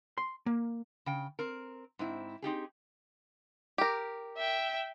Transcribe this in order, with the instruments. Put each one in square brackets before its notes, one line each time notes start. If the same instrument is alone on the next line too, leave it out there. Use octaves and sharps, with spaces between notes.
[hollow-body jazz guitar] C6
A#3
[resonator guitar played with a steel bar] C#3 G5
C4 A#4
G#2 C4 E4
C4 D#4 G4 G#4
[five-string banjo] G4 A#4
[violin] E5 G5